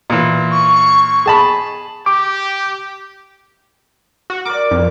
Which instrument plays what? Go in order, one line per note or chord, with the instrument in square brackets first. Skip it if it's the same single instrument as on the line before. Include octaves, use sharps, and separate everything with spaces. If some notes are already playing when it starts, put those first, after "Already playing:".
[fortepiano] A#2 E3
[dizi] C#6
[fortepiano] G#4 A5 B5
[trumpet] G4 [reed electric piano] D6
[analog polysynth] F#4
[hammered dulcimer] A#4 D5 [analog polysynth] D6
[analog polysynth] F2